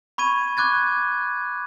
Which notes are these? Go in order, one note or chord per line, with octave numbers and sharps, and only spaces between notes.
B5 C#6 G#6 D#7
C#6 D6 F#6 G#6 A6